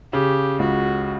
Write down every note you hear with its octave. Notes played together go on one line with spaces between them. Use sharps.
C#3 G4
C#2 F#4